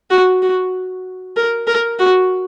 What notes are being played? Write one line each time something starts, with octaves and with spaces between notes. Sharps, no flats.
F#4
F#4
A#4
A#4
F#4